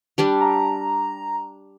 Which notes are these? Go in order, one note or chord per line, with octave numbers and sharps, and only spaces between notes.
G3 D4 G4
A#5